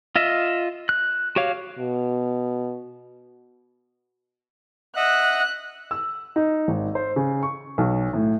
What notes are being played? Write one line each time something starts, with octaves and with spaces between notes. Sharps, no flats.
F4 D#5 E5
F#6
F#4 G4 C#5 F5
B2
D#5 E5 F#5 F#6
E6
D#4
G#1
C5
C#3
C#6
B1
A2